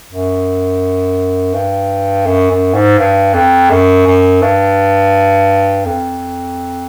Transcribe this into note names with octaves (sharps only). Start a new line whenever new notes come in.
F#2
G2
F#2
F#2
G#2
G2
F2
F#2
F#2
G2
F2